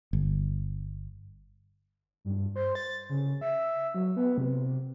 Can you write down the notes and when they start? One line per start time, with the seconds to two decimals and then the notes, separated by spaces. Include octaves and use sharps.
0.13 G1
2.25 G2
2.56 C5
2.75 A6
3.09 C#3
3.41 E5
3.94 F#3
4.16 B3
4.38 C3